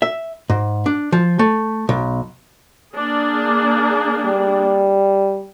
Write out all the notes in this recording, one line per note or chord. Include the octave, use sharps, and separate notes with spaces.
E5
G#2
D4
F3
A3
B1
A#3 D4 G#4
G3